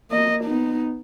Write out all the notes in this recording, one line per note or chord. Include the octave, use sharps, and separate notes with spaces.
A#3 D#5
B3 D#4